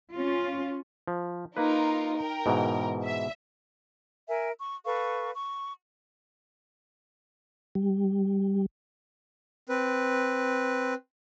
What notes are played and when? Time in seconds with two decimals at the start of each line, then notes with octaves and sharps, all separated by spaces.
0.12 C#4 F4
1.08 F3
1.57 A#3 D#4 F4 A#4 B4
2.17 A#4 G5
2.46 G#2 B2 E3
3.02 E5
4.28 A#4 E5 G#5
4.59 C#6
4.85 A4 B4 F5 C#6
5.34 C#6
7.75 G3
9.69 C4 B4